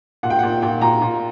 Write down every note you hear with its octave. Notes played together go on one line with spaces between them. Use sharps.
A#2 F#5
G5
A#2 F#5
A#2 G5
A#2 A#5
A#2